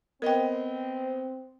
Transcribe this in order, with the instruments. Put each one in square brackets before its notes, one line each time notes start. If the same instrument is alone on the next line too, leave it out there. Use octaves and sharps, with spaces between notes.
[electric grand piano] B3 D#5 [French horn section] C4 [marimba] A#4 G5